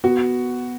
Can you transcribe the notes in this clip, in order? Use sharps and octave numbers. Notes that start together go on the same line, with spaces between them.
B3 F#4